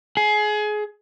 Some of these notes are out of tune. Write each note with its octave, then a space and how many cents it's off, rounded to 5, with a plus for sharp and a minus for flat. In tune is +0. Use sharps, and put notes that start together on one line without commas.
G#4 +25